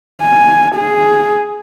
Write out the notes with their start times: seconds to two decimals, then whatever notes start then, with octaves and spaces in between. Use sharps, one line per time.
0.22 G#5
0.76 G#4